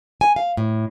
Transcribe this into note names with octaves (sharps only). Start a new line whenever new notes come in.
G#5
F5
A2